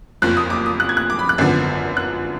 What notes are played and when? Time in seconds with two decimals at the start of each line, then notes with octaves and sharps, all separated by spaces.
0.22 F#1 F2 F3 F#6
0.37 D#6
0.50 D6
0.66 D#6
0.80 F#6
0.89 G#6
0.97 F#6
1.10 D6
1.19 B5
1.29 F#6
1.38 G#1 F#2 D3 F3 B3
1.97 F#6